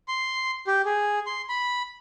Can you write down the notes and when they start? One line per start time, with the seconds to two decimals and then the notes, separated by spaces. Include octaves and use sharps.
0.08 C6
0.67 G4
0.85 G#4
1.26 C6
1.49 B5